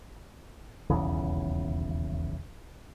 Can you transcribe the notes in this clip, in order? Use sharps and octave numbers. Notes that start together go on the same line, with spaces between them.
D#1 B1 E2 C#3